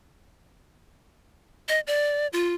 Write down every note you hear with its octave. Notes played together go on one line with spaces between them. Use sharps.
D#5
D5
F4